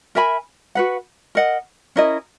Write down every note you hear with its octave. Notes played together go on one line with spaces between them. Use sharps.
A#4 E5 G#5 B5
F#4 B4 F#5
A#4 D#5 F#5
C#4 E4 A#4 D#5